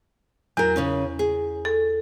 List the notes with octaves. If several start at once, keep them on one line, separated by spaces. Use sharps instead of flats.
E2 F#3 A#4
C#3 C#4 D#4
G#4
A4